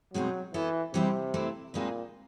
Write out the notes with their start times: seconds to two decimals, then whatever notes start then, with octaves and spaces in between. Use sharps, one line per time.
0.14 B2 F#3 G#3 C4 D#4
0.54 E3 B3 E4 A4
0.94 C3 E3 G3 C4 D#4 G4
1.34 E3 A3 C4 E4
1.74 A#2 G#3 C4 D#4 G#4 B4